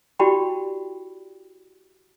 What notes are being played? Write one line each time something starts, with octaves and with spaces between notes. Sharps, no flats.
E4 F#4 G4 D5 G5 B5